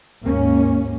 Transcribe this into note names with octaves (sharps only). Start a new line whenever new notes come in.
D#2 G#2 A#3 C#4